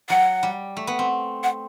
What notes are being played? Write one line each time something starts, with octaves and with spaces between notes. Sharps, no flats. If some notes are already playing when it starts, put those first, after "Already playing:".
F#3 F#5
G3
A3
B3
C4
F#5